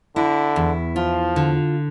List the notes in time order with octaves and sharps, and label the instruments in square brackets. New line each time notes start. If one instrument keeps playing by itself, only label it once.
[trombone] D3 [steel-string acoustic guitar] E4
[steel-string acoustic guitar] E2
[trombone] F3 [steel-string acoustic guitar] F4
[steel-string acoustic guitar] D3